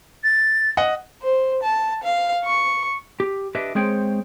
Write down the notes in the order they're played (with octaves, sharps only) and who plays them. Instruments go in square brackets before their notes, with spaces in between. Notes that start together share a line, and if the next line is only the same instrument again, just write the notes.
[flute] A6
[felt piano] D#5 F#5
[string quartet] C5
A5
F5
C#6
[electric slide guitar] G4
D4 G4 B4 D#5 E5
G#3 C4 G#4 C5 C#5 G5